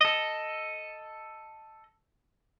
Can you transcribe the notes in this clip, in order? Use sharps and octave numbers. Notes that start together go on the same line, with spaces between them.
A4 D#5